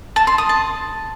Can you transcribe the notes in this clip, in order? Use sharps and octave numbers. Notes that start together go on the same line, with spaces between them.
A5
C6
D#6
A5